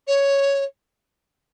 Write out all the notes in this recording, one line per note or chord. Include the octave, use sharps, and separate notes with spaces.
C#5